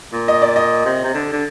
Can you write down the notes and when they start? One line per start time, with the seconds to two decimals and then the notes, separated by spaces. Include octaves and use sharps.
0.13 A#2
0.28 D#5
0.42 D5
0.56 D#5
0.85 C3
1.04 C3
1.14 D3
1.32 D3